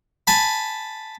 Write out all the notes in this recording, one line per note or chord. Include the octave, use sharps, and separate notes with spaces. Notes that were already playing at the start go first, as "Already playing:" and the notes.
G#5 A5 B5